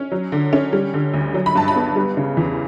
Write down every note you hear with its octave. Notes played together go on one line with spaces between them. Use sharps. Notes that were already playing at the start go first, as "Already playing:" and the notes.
Already playing: C#4
F#3
D3
C#4
G3
D3
D2
F#3
B5
G2 A5
B5
B3
G3
C#3
E2